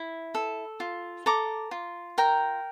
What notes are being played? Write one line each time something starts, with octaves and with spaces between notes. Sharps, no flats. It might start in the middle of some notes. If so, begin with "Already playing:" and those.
Already playing: E4
A4
F4
A4 A#5 D6
F4
A#4 G5 A#5